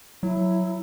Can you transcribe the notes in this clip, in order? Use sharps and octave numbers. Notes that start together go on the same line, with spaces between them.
F#3 E4